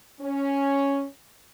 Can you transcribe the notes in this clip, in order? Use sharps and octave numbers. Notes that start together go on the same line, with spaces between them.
C#4